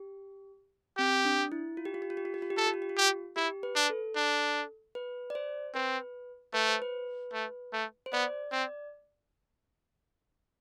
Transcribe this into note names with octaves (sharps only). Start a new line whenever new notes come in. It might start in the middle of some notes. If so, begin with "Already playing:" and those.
Already playing: G4
C4 G4
D4
E4
F4
G4
F4
G4
F4
G4
F4
G4
F4
G4
F4 A4
G4
F4
G4
F4
G4
E4 G4
B4
D4
A4
D4
B4
D5
C5
C4 B4
A3 B4
C5
B4
A3
A3
C5
B3 D5
C4 D5